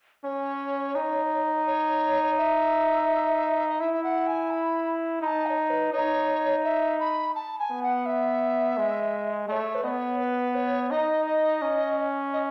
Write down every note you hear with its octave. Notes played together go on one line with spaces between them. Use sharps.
C#4 C#5
D#4
C#5
E5
D#5
E4 E5
E5
F#5
G#5
B5
D#4 A5 B5
D#5
C#5
B4
D#4 C#5
E5
B5
A5
G#5
B3
F#5
E5
G#3
A3 C#5 D#5
B4
B3 C#5 D#5
B4
C#5
D#4 D#5
D#5
C#4
D#5